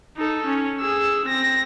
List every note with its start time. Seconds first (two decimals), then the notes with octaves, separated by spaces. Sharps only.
0.17 D#4 A4
0.46 C#4
0.81 G#4 E6
1.26 C4 A#6